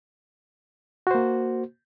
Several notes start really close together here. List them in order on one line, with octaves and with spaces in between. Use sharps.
F#4 C5 A#3